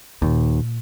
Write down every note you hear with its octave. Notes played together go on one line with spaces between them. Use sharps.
D#2 A#2